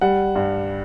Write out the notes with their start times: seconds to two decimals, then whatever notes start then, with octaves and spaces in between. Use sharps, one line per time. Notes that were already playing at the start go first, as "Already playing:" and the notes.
0.01 G3 F#5
0.35 G2